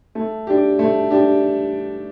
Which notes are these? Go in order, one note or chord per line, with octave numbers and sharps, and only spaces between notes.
A3
D4 G4
A3
D4 G4